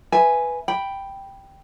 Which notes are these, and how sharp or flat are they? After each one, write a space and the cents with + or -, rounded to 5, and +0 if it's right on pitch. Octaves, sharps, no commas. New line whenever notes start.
B4 +0 E5 +0 G#5 +0
G5 +0 B5 +0